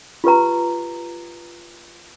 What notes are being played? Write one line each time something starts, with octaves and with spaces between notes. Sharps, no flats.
F4 G4 B4 A#5